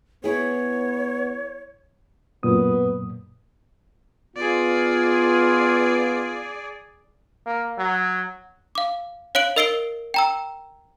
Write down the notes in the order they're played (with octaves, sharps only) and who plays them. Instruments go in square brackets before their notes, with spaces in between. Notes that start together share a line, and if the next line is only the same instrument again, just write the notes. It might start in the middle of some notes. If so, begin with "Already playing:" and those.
[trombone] B3 [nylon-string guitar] E4 G#4 [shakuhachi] C#5
[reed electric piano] F#2 A#2 D#6 [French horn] B3
[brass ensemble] B3 F4 [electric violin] G#4 D5
[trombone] A#3
F#3
[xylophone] F5 D6
C#5 F5 F#6 D7 F#7
A#4 D#5 E6 C7 D7 G7
G5 A#5 E6